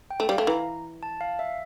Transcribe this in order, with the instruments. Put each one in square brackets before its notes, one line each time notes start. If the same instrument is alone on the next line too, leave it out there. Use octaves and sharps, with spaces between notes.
[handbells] G5
[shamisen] A3
[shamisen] G3 [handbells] F5
[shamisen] A3
[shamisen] E3 [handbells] A#5
[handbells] A5
F5
E5